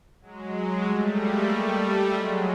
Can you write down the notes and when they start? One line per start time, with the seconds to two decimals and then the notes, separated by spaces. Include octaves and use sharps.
0.21 F#3 G#3
0.85 G3 A3
1.17 G#3 A#3
1.48 G3 A3
2.11 F#3 G#3